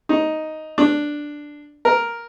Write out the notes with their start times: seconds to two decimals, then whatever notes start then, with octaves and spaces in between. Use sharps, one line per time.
0.09 D#4
0.78 D4
1.85 A#4